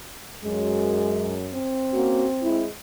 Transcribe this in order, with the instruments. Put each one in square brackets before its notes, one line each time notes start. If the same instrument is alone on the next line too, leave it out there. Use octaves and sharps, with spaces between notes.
[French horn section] F#2 [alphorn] G#3
[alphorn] C4
[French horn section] A#3 C#4 F#4
G#3 E4